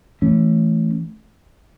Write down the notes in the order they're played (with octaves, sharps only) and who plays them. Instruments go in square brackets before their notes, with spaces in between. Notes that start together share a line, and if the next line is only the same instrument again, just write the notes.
[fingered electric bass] E3 A3 C#4